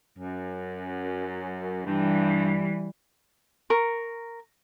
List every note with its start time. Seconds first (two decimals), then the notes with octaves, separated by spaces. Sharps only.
0.18 F#2
1.85 G2 E3 G3
3.70 A#4 C#6